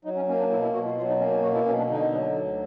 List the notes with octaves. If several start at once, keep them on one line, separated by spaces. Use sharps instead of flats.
F#3 D#4
C#4
A#3 C#4
D4
B2 E4
E4
B2 F#4
F4
F#3 F4
D#4
A#3 C#4
C#4
B2 F#4
E4
B2 C#4
D4
D3 D#4
F#3
D2